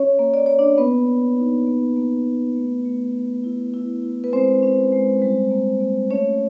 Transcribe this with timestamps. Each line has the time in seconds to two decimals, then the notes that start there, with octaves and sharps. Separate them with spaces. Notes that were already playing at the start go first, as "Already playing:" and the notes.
Already playing: C#4 C#5
0.19 A#3
0.34 D5
0.46 A#3 C#5
0.59 D4 D5
0.78 A#3 B3 B4
1.08 A#3
1.37 D#4
1.67 A#3
1.96 A#3
2.26 A#3
2.55 A3
2.85 A3
3.15 A3
3.44 E4
3.74 E4
4.03 E4
4.24 B4
4.33 G#3 C4 C5
4.63 C#4
4.92 G#3
5.22 G3
5.51 A#3
5.80 A#3
6.10 A3 C#4 C#5